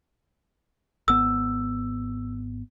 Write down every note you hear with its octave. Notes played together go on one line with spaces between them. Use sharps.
G#1 B3 E6